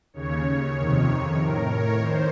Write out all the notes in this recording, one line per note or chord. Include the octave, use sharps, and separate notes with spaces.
D#2 C#3 C#5
F2 C3 D#3
A2 A#4
C#5
D#3 C5